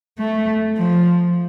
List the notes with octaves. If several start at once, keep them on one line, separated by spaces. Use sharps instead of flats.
A3
F3